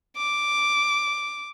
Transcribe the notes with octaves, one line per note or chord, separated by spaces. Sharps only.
D6